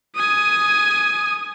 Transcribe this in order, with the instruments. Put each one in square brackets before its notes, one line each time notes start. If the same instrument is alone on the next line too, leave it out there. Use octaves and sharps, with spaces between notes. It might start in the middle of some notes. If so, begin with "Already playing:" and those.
[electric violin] G#5 D#6